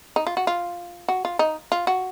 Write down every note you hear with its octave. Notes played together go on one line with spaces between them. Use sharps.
D#4
F4
F#4
F4
F#4
F4
D#4
F4
F#4